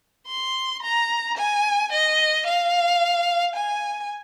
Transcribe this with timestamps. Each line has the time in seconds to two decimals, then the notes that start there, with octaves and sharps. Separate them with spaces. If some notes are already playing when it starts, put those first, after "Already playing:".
0.28 C6
0.82 A#5
1.37 G#5
1.92 D#5
2.46 F5
3.55 G#5